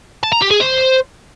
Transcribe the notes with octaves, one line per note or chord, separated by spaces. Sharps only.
A5
A#5
G4
G#4
C5